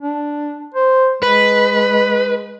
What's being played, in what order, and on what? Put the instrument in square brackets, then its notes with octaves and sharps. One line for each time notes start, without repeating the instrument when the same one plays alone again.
[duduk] D4
C5
[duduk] G#3 [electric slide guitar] B4